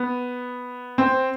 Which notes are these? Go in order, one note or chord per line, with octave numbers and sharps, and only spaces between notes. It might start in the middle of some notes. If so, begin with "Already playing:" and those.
Already playing: B3
C4